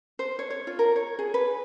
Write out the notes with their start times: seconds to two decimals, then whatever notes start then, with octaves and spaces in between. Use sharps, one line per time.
0.19 C5
0.39 C#5
0.50 C#5
0.67 F4
0.79 A#4
0.96 C#5
1.19 G#4
1.34 B4